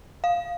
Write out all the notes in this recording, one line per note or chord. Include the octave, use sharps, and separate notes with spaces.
F5